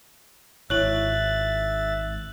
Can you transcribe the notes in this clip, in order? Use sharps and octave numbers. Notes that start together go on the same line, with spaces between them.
G#1 G#2 E4 C#5 E5 F#6 A6 F#7